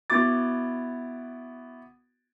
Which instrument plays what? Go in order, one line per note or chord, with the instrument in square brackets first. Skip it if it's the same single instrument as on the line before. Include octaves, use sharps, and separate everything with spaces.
[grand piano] B3 E4 F#4 D6 A6